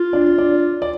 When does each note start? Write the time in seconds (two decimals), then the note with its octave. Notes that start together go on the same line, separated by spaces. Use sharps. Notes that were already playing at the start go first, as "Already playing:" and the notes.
Already playing: F4
0.13 D4 D5
0.38 D4 D5
0.82 D5